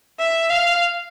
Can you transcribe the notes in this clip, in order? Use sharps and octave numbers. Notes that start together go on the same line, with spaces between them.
E5
F5